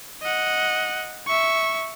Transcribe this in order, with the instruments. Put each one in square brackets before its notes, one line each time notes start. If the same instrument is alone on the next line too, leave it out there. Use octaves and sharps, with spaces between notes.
[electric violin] D#5 F#5
E5 C#6